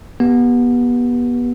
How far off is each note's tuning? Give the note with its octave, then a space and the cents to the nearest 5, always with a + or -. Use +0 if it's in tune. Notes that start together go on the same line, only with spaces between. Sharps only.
B3 -25 G4 +0